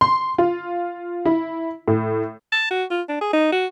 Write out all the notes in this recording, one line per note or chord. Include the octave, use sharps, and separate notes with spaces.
C6
F4
E4
A2
A5
F#4
F4
D4
G#4
D#4
F#4